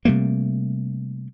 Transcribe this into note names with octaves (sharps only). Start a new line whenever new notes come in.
C3 G3 A3 A#3